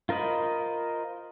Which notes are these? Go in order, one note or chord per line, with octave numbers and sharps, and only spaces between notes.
F4 A#4 C5 D#5 B5